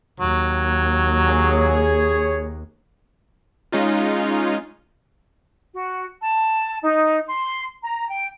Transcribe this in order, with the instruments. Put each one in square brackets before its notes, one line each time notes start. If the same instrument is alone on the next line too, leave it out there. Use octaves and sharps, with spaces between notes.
[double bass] D#2 [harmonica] F#3
[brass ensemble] G#4 C#5
[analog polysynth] G#3 C#4 D#4 F4
[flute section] F#4
A5
D#4
C6
A#5
G5